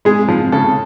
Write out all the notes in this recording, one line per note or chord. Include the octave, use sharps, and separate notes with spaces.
G#3 G#4
F3
C#3 A4